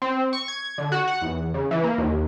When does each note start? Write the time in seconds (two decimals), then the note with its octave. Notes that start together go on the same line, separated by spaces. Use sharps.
0.02 C4
0.33 C#6
0.48 G#6
0.78 D3
0.92 F#4
1.08 F#5
1.22 E2
1.54 C#3
1.71 E3
1.83 A#3
1.98 D#2